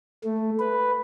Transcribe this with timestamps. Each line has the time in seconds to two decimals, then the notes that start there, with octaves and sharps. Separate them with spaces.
0.24 A3
0.59 B4